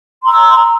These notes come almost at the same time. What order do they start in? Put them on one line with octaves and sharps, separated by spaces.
C6 A#5 E6